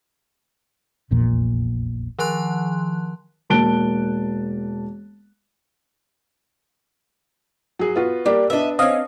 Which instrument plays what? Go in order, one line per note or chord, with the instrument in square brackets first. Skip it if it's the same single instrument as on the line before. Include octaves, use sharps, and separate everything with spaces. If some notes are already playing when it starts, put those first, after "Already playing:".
[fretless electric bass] F1 A#1 E2 A#2
[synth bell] D#3 F3 A5 C6 F#6
[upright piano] E1 A#3 A5 F#6 D7 G7
[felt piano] F#3 G#4
B3 F4 F#4
[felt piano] G3 A#3 G4 [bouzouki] D4
[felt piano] B3 D4 [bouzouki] D#5 E5
[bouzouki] C4 C#4 [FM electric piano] D#5 F5